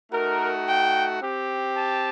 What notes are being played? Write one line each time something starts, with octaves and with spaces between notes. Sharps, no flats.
A3 D#4 F#4 A#4
G5
C4 G4
A5